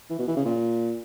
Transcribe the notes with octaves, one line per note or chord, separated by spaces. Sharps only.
E3
B2
E3
C#3
A#2